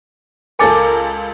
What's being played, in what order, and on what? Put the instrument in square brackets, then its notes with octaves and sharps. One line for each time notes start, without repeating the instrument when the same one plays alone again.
[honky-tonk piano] C#2 A4 C#7 [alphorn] A#4 [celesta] G#5 D6 A6